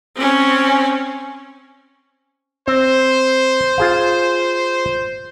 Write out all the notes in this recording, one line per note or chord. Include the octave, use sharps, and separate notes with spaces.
C4 C#4
C4 C5
F4 G#4 F5